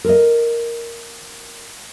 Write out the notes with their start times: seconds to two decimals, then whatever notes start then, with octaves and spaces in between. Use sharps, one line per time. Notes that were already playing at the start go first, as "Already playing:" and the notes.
0.04 A#4 D#5